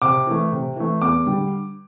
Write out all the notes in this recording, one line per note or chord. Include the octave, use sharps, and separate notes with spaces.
C3 D6
E3 A3
C3
E3 A3
E2 D6
D3 G3